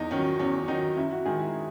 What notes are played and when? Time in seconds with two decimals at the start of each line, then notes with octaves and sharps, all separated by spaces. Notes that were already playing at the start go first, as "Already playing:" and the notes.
Already playing: E2 D#4
0.11 D#3 F#3 C#4
0.39 E2 C#4
0.68 D#3 F#3 D#4
0.97 F#2 E4
1.11 F#4
1.26 D#3 G#3 G#4
1.39 E4